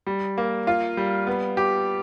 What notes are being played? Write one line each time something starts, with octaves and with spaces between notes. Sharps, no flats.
G3
A#3
F4
G3
B3
G4